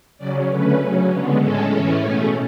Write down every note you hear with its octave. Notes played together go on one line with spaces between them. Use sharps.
C#3 F#3 C#4 D5
D3 A3 C#4 B4
C#3 F#3 C#4
D3 G#3 B3
A2 G#3 C#4 A4
A2 E3 A3 C#4
B2 A3 C#4 G#4